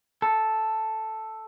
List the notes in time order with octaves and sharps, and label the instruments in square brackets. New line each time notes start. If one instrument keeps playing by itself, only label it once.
[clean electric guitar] A4